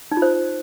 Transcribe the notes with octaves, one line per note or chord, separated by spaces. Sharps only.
D#4
F4
C5